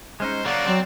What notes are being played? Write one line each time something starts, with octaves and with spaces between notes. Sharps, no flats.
G#3 C#4 D#4 C5
F#3 A#3 D5 F#5
F#3 C4